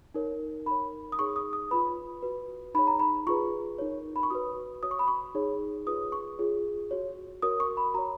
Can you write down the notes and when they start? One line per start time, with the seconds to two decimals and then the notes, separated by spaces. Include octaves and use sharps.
0.14 D#4 A#4 C#5
0.66 D#4 A#4 C#5 B5
1.12 D#6
1.19 D#4 G#4 C#5 C#6
1.36 D#6
1.53 D#6
1.71 F4 B4 B5
2.23 F#4 B4
2.74 D#4 G#4 C#5 B5
2.87 A#5
2.99 B5
3.27 F4 G#4 B4 C#6
3.79 D#4 A#4 C#5
4.16 B5
4.23 C#6
4.30 F#4 B4 D#6
4.83 F#4 C#5 D#6
4.91 C#6
4.99 B5
5.08 C#6
5.35 D#4 G#4 C#5
5.86 F4 G#4 B4 D#6
6.12 C#6
6.38 F4 G#4 C#5
6.91 F#4 C#5
7.42 F#4 A#4 C#5 D#6
7.60 C#6
7.77 B5
7.94 F#4 C#5 A#5